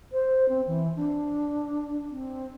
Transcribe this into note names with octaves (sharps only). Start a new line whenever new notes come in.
C5
C4
E3
D4
C4